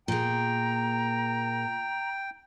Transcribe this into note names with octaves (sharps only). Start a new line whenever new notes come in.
A#2 G#4 G5 A#5